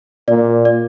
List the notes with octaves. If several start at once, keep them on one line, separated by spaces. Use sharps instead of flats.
A#2 D5
D5